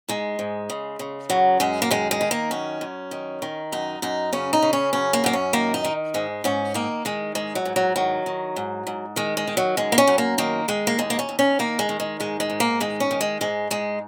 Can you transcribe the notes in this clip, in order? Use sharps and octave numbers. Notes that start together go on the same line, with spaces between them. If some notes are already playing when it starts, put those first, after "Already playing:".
G#2 G#3
G#2
C#3
C#3
F#2 F#3
F#2 G#3
A#3
D#3 G#3
G#3
D#3
A#3
F#2 C#4
F#2
D#3
D#3
F#2 D#4
F#2 D#4
C#3 C#4
D#4
C#3
C#4
F#2 C#4
A#3
F#2 A#3
C#4
D#3 A#3
D#4
D#3
G#2 G#3
G#2 C#4
D#3 A#3
D#3 G#3
G#2 G#3
F#3
G#2
F#3
D#3 F#3
D#3
G#2
G#2
D#3 G#3
G#3
D#3
F#3
F#2 G#3
A#3
C#4
F#2
A#3
D#3 A#3
D#3 G#3
A#3
D#2 G#3
A#3
C#4
D#2
C#4
D#3 A#3
G#3
D#3
G#3
G#2 G#3
G#3
G#2
A#3
D#3 G#3
C#4
D#3
G#3
G#2 G#3
G#2 G#3